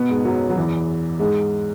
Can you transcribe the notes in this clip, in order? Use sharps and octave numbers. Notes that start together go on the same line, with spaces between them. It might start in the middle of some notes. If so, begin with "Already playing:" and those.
Already playing: B2 B3
G#2 G#3
F#2 F#3
F#3
E2 E3
G#2 G#3